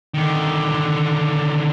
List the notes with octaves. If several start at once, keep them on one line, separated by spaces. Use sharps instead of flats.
D3 D#3